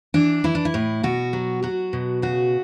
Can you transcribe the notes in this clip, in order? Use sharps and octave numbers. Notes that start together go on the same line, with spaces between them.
E3 D4
E3 E4
D4
E4
A2
B2 F#4
F#3
F#3 F#4
B2
C#3 F#4